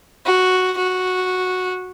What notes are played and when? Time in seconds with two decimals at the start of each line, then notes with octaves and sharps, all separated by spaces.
0.26 F#4
0.78 F#4